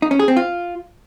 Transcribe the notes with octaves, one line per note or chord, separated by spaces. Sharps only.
D#4
C#4
G#4
C4
F4